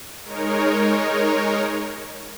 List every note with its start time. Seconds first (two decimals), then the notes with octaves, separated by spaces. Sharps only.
0.24 G#3 D#4 A#4 C#5